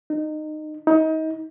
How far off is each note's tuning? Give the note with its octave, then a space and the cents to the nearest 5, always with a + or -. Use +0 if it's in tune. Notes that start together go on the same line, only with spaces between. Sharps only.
D#4 -20
D#4 +30